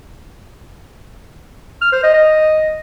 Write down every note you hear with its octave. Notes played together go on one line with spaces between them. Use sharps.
F6
C5
D#5
D#5